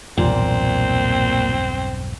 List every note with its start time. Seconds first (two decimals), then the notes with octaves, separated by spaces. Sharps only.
0.18 B1 E2 G2 A#2 C4